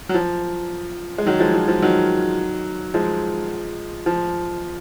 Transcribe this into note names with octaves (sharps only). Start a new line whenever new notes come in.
F#3
F3
G#3
D#3 F#3
F3 G#3
F3
F3
D#3 F#3
F3 G#3
F3